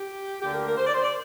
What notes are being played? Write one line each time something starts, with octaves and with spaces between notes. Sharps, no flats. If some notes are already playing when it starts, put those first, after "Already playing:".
Already playing: G4
D2 D3 A#3 G4
A#4
A#4
C5
D5
C5
D5